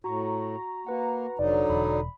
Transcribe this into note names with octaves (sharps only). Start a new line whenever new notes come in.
A2 F#4 A#5 C#6
A#3 F#4 B4 F#5
F1 D3 F#3 D#4 D5
E1 B5